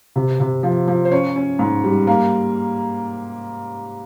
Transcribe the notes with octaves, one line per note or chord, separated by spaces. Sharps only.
C3
C3
F3
F3
C5
C#4 C#5
C#4
G#2
G3
A#3